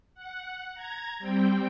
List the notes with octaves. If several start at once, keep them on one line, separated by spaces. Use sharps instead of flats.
F#5
A#5 G#6
G3 C4 G5